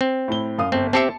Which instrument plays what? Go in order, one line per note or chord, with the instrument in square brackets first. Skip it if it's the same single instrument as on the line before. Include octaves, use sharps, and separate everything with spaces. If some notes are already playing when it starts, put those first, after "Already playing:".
[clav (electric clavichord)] C4
[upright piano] A2 E4 G7
F#2 F5 D#6
[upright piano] G1 [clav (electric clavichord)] C4
[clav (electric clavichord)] C4 G4 E5 [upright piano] A5 C7 C#7